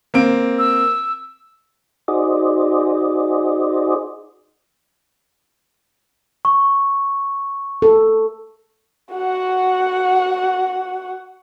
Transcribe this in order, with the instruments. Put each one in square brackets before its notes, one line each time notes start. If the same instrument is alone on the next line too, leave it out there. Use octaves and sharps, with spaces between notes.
[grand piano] A#3 C4 D7
[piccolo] E6
[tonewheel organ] D#4 F#4 G#4 C5 D5 D#5
[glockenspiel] C#6
[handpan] A4
[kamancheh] F#4 F#5